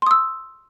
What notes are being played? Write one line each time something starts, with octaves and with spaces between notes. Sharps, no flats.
C6 D#6 E6